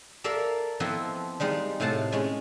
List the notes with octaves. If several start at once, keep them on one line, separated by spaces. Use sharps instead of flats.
A4 A#4 D5 E5 F5 A#5
F3 B3 C4 E4 A4 D#5
G3 G#3 D#4 F4
A2 C3 F5 F#5 A5
G#3 C#4 G#5